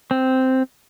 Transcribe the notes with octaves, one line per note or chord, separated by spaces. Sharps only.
C4